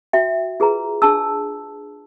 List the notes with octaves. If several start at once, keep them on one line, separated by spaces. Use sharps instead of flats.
F#4 E5 G5
F4 G#4 B4 A#5
D4 G#4 A5 E6